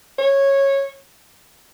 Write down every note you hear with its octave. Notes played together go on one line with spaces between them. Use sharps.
C#5